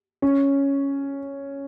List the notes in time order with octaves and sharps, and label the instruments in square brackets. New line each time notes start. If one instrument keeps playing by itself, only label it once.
[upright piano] C#4